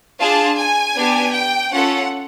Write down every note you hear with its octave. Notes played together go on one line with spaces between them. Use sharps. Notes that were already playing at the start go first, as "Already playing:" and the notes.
D4 F4 G#4 A5
G#5
B3 D4 G4
G5
C#4 F4 A4 F#5